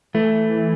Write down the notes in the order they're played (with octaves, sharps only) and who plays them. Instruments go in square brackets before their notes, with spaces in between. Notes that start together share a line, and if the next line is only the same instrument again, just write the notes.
[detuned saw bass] E3 [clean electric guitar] A3